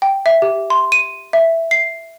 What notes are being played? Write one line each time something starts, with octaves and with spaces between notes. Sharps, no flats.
G5
E5
G4
C6
D#7
E5
C7